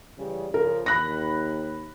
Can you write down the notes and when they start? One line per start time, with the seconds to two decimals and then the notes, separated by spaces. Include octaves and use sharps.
0.17 C#3 E3 G3
0.54 C#3 F3 A#4
0.86 D#2 B5 F#6 A#6